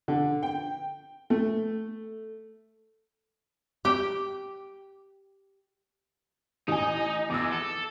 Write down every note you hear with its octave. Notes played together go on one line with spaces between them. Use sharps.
D3
G5
A3
G4 G5
A1 D#4 G#5
E2 D6 E6
A4